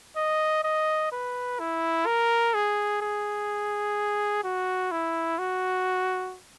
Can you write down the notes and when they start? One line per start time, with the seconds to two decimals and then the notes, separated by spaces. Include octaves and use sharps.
0.17 D#5
0.64 D#5
1.12 B4
1.60 E4
2.06 A#4
2.54 G#4
3.02 G#4
4.44 F#4
4.92 E4
5.39 F#4